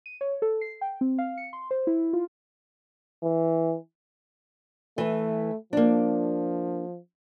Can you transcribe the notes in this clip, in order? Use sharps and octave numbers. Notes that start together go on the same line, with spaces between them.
D#7
C#5
A4
C7
G5
C4
F5
C#7
C6
C5
E4
F4
E3
E3 A3 B4
F3 A#3 D4